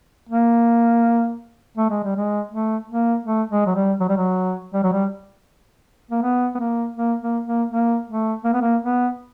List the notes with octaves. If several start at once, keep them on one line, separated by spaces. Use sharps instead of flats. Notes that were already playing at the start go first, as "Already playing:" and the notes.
A#3
A3
G#3
G3
G#3
A3
A#3
A3
G#3
F#3
G3
F#3
G3
F#3
G3
F#3
G3
A#3
B3
B3
A#3
A#3
A#3
A#3
A#3
A3
A#3
B3
A#3
B3